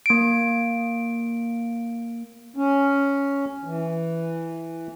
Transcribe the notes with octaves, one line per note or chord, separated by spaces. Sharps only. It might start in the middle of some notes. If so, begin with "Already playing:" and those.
A#3 D7
C#4
E3